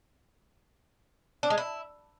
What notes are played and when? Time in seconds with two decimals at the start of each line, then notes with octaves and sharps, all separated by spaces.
1.43 D4
1.50 G#3
1.58 E4